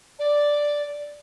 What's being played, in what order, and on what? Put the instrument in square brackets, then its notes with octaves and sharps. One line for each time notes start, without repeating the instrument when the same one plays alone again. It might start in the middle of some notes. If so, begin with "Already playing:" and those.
[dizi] D5